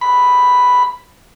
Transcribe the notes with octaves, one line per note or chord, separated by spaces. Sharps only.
B5